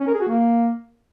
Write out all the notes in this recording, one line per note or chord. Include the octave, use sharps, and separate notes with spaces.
C#4
A#4
G#4
F#4
A#3